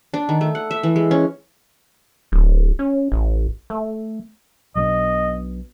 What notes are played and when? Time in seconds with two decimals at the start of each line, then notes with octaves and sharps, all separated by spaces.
0.14 D4
0.29 D#3
0.41 A3
0.55 F#5
0.71 E5
0.83 E3
0.96 G#3
1.11 C#4
2.32 D1
2.79 C#4
3.12 A1
3.70 A3
4.76 B1 B2 D4 D#5